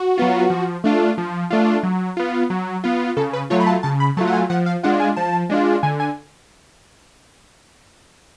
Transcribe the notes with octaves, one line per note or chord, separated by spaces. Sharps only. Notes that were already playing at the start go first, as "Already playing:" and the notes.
Already playing: F#4
F#3 B3 F4
F3
A3 D4 F4
F3
A3 D4 F4
F#3
B3 F4
F#3
B3 F4
C#3 A4
B4
F#3 A3 F4 C#5
B5
A5
C#3 A5
B5
F#3 A3 F4 A5
F#5
G#5
F3 F#5
F5
G#3 D4 F4 F#5
G#5
F3 A5
G#3 D4 F4
D3 G#5
G#5